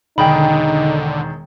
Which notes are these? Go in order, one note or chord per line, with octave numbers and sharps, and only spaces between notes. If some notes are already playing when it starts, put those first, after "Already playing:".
E1 D3 D#3 D#4 G#4 G5 B5